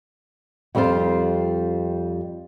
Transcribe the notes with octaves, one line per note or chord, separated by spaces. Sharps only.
F2 G3 C4 F4 C5